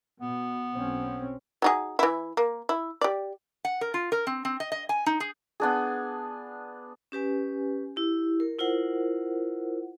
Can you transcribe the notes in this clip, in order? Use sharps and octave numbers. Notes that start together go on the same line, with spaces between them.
B2 B3
B1 C4 C#4
F#3 D#4 G#4
E3 E4
A#3
E4
G4 D5
F#5
A#4
F4
A#4
C4
C4
D#5
D#5
G#5
D#4
G#4
B3 D4 G#4
C#4 G4 B4 G#5
E4 G4
A#4
E4 F4 A#4 C5 F#5